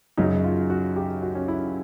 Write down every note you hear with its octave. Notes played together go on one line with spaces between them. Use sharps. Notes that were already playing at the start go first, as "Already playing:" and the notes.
F#2 C#3 F#3 D#4
F4
F#4
G4
F#4
C#4
E4